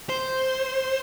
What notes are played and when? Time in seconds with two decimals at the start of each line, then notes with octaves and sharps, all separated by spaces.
0.09 C5